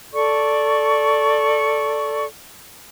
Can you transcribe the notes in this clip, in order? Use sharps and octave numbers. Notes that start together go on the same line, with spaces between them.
A4 D5 C#6